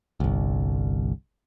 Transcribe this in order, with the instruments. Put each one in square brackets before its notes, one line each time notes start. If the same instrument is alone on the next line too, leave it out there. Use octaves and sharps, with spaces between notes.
[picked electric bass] G1 C2